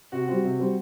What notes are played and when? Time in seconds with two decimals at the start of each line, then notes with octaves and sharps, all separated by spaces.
0.12 C3 F#4
0.28 G3 C4 F#4
0.43 C3
0.59 G3 C4